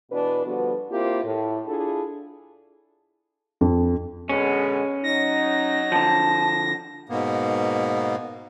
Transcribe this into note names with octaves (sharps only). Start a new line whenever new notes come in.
B2 E3 D4 B4
D3 F3 G3 B3 F#4 B4
A#3 C4 E4 F4 G4 A#4
A2
D4 E4 F4 G#4 A4
F2
B2 D3 G#3 C#4
F#3 D#4 A#6
D3 F3 A5
G#2 B2 A#3 B3